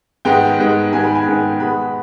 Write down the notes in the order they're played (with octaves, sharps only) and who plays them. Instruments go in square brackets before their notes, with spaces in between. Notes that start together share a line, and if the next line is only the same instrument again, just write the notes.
[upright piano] G#2 D#3 G#3 B3 G5
G#2 D#3 G#3 B3
G#2 D#3 G#3 B3 G#5
B5
G#5
G#2 D#3 G#3 B3
B2 G#3 B3 B5